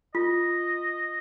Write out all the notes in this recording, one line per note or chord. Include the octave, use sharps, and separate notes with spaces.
F4 D#5